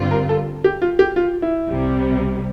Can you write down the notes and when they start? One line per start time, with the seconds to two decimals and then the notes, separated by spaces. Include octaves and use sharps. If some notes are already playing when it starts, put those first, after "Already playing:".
Already playing: G2 D3 G3 C4 F4
0.11 A#4
0.29 A4
0.64 G4
0.82 F4
0.99 G4
1.16 F4
1.42 E4
1.68 C2 C3 G3